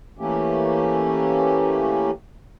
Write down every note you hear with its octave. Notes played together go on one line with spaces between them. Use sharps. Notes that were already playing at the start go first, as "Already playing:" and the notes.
E3 A3 A#3 C#4 G4